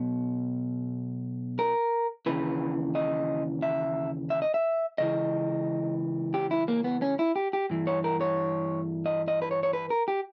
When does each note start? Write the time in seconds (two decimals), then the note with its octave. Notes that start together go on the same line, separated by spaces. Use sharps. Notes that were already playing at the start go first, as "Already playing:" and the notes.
Already playing: B1 B2
1.59 A#4
2.26 D#2 C#3 E3 B4
2.95 D#5
3.62 E5
4.30 E5
4.42 D#5
4.54 E5
4.98 C#2 C#3 E3 D#5
6.34 G4
6.51 E4
6.68 A#3
6.84 B3
7.02 C#4
7.19 E4
7.36 G4
7.53 G4
7.70 G2 E3
7.87 C#5
8.04 A#4
8.21 C#5
9.06 D#5
9.28 D#5
9.42 B4
9.51 C#5
9.63 C#5
9.73 B4
9.90 A#4
10.08 G4